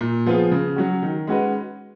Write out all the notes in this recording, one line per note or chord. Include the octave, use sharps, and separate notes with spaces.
A#2
F3 B3 F4 G#4
C#3
F#3 C#4 F#4
D#3
G#3 C#4 F#4 B4